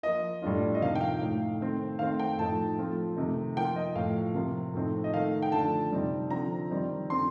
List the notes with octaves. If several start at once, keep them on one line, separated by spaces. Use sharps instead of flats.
F3 A#3 F4 D#5
A2 G3 D4 F4
D#5
C3 F3 A#3 D#4 F5
G5
F5
A2 A3 D#4
D#3 A3 C4
D#3 A3 C4 F5
G5
A2 F3 A3 D#4 A5
F3 A3 C4 F4
C3 D#3 A3 D#4
F3 A#3 F4 G5
D#5
A2 F3 A3 F5
C3 F3 A#3 F4
A2 F3 A3 C4 D#4
D#5
D#3 A3 D#4 F5
G5
D3 F3 A3 A5
C3 G3 C4 D#4
D3 F3 C4 A#5
D#3 G3 C4 D#4
D3 F3 C4 C6